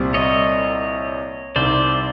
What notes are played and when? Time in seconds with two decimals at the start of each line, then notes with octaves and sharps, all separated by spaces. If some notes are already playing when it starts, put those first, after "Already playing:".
Already playing: C2 A#2 G3 C4
0.14 C#5 D#5
1.56 C2 C3 D#3 C5 D5